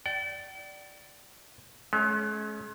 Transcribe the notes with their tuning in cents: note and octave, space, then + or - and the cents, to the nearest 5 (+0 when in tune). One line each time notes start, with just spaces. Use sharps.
D5 +0 G5 -45
G#3 +45 C#4 +0